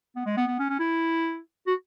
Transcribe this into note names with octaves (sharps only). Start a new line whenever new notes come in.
B3
G#3
B3
B3
C#4
C#4
E4
F#4